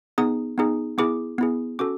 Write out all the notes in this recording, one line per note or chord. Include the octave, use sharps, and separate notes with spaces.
B3 D#4 G#4 D#6
B3 D#4 G#4
B3 E4 G#4 D6
B3 E4 G#4
C#4 F#4 A4 D6